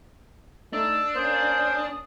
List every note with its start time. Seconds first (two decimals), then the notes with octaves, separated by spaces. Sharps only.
0.73 A3 D4 D#4 E6
1.16 A#3 C#4 C5 D#6